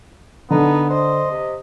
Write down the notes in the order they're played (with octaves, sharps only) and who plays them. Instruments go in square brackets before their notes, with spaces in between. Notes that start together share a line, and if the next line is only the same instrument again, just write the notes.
[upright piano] D3 [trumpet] B3 [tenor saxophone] D#4
[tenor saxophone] C5 [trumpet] D#5
[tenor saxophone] C3